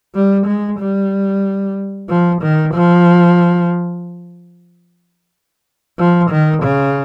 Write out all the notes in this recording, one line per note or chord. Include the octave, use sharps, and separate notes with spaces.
G3
G#3
G3
F3
D#3
F3
F3
D#3
C#3